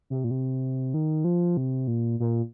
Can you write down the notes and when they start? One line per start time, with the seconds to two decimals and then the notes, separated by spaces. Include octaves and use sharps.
0.10 C3
0.24 A#2
0.31 C3
0.94 D#3
1.24 F3
1.57 C3
1.88 A#2
2.20 A#2